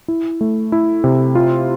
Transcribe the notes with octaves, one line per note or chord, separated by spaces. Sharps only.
E4
A3
E4
C3
F4